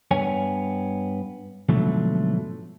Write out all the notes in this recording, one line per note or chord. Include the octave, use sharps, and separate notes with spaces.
G2 B3 C#5 G#5
G#2 B2 D3 F3 F#3 A3